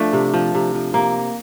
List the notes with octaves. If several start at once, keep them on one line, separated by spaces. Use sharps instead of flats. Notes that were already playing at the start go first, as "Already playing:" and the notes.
Already playing: F3 A3 D4
C3
F3
C3
F3
C3 A#3